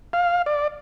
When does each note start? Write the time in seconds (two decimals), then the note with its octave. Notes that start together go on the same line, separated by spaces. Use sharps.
0.13 F5
0.46 D5